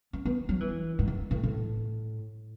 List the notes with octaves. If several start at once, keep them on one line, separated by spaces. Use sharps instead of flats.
C#4
B3
F#3
E3
G#2
F#2
A2
A2